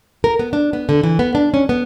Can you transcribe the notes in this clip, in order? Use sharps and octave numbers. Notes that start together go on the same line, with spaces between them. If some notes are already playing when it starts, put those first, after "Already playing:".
A#4
B3
D4
B3
D3
E3
B3
D4
C#4
B3